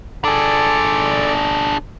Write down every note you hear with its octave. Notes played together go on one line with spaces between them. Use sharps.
D4 G#4 A4 D5